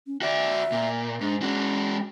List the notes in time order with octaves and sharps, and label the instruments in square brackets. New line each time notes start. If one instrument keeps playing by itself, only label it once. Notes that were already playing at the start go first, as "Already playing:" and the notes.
[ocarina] C#4
[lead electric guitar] F#4 D5 [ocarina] E5
[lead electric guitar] A#2
[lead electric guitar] G#2 [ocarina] D4
[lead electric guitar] G#3 F#4 [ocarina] C#4